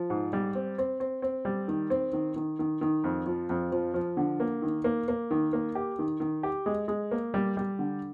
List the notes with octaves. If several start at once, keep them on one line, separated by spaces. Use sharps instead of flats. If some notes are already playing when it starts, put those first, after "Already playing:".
Already playing: F3
G#2
G3
C4
C4
C4
C4
G3
D#3
C4
D#3
D#3
D#3
D#3
F2
F3
F2
F3
F3
D3
A#3
D#3
A#3
A#3
D#3
A#3
G4
D#3
D#3
G4
G#3
G#3
A#3
G3
G3
D3